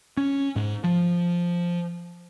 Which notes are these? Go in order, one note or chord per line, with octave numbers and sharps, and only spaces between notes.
C#4
G#2
F3